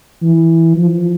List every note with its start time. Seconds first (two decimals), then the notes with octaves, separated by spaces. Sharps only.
0.22 E3
0.76 F3